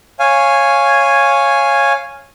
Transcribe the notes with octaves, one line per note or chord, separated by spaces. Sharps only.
C#5 F5 G#5